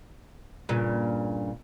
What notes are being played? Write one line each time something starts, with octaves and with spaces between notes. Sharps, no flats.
G2 A#2 C#3